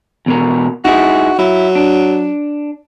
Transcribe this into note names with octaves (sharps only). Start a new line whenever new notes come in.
E2 B2 A#4
D#4 E4 F#4 G#4
F#3 E4
D4